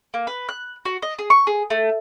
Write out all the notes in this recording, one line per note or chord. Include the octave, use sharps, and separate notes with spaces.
A#3
B4
F#6
F#4
D#5
G#4
C#6
G#4
A3